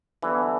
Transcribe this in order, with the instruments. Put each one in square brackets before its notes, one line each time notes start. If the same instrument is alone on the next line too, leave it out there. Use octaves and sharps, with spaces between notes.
[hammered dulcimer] D3 G3 B3 [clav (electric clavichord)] E3